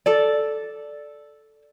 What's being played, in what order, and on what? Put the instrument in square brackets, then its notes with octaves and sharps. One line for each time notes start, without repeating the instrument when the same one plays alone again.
[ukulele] A4 D5